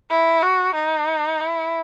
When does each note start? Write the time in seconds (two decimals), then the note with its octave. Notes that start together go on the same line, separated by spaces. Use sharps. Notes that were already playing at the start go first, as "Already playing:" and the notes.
0.10 E4
0.43 F#4
0.75 D#4
1.40 E4